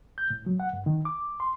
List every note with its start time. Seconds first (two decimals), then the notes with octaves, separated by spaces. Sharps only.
0.18 G6
0.30 A2
0.46 F#3
0.60 F#5
0.73 G2
0.86 D#3
1.05 D6
1.40 C6